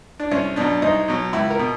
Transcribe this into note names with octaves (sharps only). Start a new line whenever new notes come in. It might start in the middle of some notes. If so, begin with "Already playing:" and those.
D4
C2 C#4
B2 F#3 D4
C2 D#4
B2 F#3
C#2 E4
A#4
B2